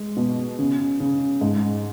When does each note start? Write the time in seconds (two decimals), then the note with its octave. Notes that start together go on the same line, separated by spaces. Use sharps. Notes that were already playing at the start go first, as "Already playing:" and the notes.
Already playing: G#3
0.17 B2
0.59 C#3
1.00 C#3
1.41 G#2